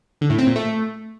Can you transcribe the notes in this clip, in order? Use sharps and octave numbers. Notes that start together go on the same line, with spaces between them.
D3
A2
C4
A#2
A3